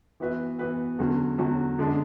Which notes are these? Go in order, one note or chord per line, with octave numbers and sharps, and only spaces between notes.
E3 B3 F#4 B4 E5
E3 B3 F#4 B4 E5
E2 D3 F#3 C#4 F#4
E2 D3 F#3 C#4 F#4
F#2 D3 G#3 D4